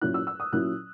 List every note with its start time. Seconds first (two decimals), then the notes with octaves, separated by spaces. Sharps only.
0.01 A#2 F#3 C#4 E4 F#6
0.14 E6
0.27 E6
0.40 D#6
0.53 A#2 F#3 C#4 E4 F#6